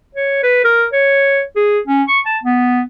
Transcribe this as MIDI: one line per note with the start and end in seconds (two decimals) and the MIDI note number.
0.15 0.39 73
0.43 0.60 71
0.64 0.86 70
0.93 1.42 73
1.56 1.79 68
1.87 2.03 61
2.08 2.19 85
2.26 2.38 81
2.43 2.82 59